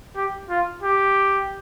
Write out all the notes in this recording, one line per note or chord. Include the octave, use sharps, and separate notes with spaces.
G4
F4
G4